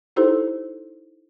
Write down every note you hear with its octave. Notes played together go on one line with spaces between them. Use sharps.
D#4 E4 G4 A4 C5